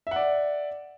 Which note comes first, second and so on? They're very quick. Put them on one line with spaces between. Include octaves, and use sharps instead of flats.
E5 F#5 D5